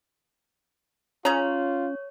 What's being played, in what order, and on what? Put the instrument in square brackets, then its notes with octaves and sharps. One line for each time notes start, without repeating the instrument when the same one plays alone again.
[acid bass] C#4 [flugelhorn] F4 [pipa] G#4 A#5 [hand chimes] C#5